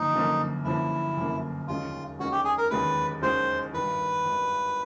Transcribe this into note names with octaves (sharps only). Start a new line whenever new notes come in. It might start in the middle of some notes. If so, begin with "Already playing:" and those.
Already playing: G1 F#2 D3 F3 A#3 D#4
G1 F#2 D3 F3 A#3
G1 F#2 D3 F3 A#3 E4
G1 F#2 D3 F3 A#3
E1 D#2 D#3 G#3 C#4 F4
E1 D#2 D#3 G#3 C#4 F#4
G4
G#4
A#4
E1 D#2 D#3 G#3 C#4 B4
E1 D#2 D#3 G#3 C#4 C5
G#1 G2 D#3 B4
G#1 G2 D#3